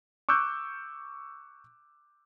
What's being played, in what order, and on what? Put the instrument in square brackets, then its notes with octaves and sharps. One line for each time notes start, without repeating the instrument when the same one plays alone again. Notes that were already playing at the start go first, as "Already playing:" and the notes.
[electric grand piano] C#6 D6 E6 F#6 G6